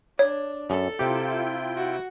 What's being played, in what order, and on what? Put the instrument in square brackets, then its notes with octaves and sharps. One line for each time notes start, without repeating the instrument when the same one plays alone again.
[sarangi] D4 [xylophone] C#5
[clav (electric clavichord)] F#2 [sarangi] A4
[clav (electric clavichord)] C3 G4 [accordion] E4 F4 G5
[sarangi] F#4